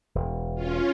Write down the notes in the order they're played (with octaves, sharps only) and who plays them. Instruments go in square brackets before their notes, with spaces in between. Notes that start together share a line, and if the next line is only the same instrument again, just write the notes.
[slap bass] E1
[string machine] C#4 F4